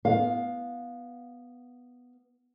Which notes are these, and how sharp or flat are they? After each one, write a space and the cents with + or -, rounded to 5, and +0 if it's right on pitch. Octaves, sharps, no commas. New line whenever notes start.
B3 +0 F5 +10